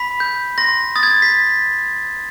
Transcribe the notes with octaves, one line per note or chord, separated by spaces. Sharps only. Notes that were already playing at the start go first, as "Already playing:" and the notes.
Already playing: B5 B6
G6
C6 A#6
D#6 A6
G#6
A6
B6